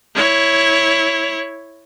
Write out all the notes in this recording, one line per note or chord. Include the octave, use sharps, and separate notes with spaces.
E4 C#5